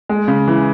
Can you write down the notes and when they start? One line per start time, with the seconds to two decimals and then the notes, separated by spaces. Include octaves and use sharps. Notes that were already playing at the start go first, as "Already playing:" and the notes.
0.09 G#3
0.28 C#3
0.48 E3